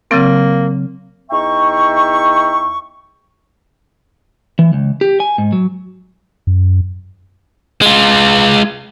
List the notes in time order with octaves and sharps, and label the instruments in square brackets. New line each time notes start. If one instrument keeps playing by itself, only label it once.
[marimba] C#3 F#3 C4 [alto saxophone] A#3
[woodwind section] E2 D#4 E5 G5 C#6
[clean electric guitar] E3
C#2
G4
G#5
G#2
F#3
[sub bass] F#2
[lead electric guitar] G#3 F4